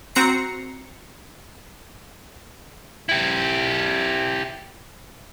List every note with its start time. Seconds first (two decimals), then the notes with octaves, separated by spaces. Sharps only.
0.15 C4 F#4 A#5 C7 C#7
3.09 E4 G4